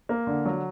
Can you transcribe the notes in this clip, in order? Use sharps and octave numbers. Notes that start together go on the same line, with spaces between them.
A#3
D3
F#3